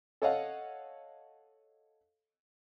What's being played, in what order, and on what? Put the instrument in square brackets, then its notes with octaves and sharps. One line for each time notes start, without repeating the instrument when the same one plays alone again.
[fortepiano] A4 C#5 D#5 F5 F#5